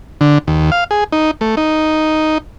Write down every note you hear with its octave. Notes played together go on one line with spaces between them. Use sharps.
D3
D#2
F5
G#4
D#4
A3
D#4